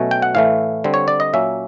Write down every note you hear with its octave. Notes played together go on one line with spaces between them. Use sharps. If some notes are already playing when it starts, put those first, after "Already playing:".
Already playing: B2 F#3 A3 C#4
G5
F#5
A2 E3 A3 F5
D3 G3 C4
C#5
D5
D#5
A#2 F#3 A#3 C#4 E5